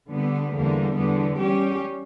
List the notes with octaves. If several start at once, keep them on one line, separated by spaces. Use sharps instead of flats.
D3 G3 B3
E2 D3 G3 A#3
E2 D3 G3 B3
G3 C#4 G4